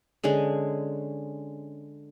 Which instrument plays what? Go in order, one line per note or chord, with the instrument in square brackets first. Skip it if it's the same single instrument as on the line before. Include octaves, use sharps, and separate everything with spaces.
[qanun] D3 G#3 C#4 G#4